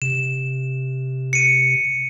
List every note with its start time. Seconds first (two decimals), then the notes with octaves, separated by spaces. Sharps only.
0.02 C3 E7
1.33 C#7 D#7